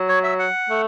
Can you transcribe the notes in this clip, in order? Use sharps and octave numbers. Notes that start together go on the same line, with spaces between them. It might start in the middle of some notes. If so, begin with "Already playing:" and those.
Already playing: F#3
C#5
E5
F#5
A3